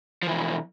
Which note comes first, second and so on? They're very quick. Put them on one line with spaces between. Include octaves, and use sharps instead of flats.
F3 E3 B2